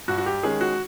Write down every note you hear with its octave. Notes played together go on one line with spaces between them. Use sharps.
G2 F#4
F#4
G4
D#3 G#3 C#4 G#4
F#4